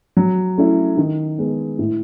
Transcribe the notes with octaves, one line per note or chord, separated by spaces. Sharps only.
F#3
A3 C#4 E4
D#3
G#3 B3
A2